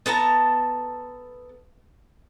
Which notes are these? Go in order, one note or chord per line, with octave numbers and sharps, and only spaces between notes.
B3 A4 A5 A#5